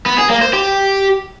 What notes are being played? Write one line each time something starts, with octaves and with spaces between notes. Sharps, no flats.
B3
G#4
A#3
C5
G4